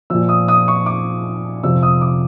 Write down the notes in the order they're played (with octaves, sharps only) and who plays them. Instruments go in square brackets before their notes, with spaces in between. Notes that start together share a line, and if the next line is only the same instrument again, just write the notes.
[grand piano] A#2 F3 E6
D#6
D#6
C#6
D6
F2 C3 F3 E6
D#6
D6